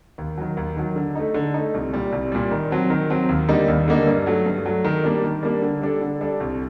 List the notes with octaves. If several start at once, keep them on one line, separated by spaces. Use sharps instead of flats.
D#2
D#3 F#3
D#2
D#3 F#3
D3
A3 D#4
D3
A3 D#4
C2
A#2 G3
C2
A#2 G3
D#3
F#3 C4
D#3
F#3 C4
D#2
D3 G3 A#3 D#4
D#2
D3 G3 A#3 D#4
G2
F#3 A3
G2
F#3 A3
D#3
G3 A#3 D4
D#3
G3 A#3 D4
D3
G3 D4 A4
D3
G3 D4 A4
C2